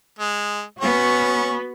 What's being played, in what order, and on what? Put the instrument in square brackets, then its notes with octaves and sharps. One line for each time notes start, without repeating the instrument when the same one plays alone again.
[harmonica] G#3
[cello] B3 F#4 [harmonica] C#4 C#5